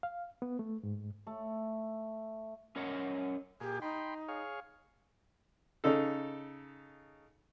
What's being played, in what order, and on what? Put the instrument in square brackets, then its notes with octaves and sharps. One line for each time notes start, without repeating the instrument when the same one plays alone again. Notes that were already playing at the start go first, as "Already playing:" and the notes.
[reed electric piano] F5
B3
A3
G#2
[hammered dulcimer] A3
[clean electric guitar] C#4 A#4 C#5 D#5 F#5
[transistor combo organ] A#2 G#4 [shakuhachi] G4
[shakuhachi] D#4 [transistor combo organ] G5 B5 C6
[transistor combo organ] G#4 C#5 F5
[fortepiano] C#3 D#4 A4